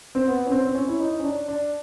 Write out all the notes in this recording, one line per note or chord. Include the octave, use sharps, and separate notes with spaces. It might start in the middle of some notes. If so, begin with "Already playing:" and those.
C4
B3
C#4
C4
C4
C#4
E4
D#4
C#4
D4
D4